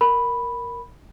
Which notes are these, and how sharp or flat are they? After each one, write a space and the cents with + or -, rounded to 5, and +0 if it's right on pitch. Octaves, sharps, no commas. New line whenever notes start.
A#4 +0 B5 +0